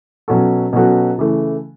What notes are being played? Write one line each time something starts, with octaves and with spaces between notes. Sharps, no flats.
B2 F#3 C#4 F#4 A4
B2 F#3 C#4 F#4 A4
C#3 E3 A3